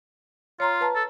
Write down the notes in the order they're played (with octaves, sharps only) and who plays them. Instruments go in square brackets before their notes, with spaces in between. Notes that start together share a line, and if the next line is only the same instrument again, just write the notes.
[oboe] F4 [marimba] C#5 A#5 C6
[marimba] B4 A5 A#5
[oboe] A4